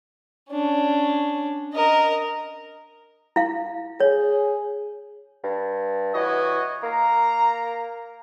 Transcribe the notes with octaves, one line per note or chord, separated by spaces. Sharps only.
C#4 D4
A#4 D#5
E4 F5
G#4 C#5
G2
E3 F#4 C#5 D#5
A#3 A#5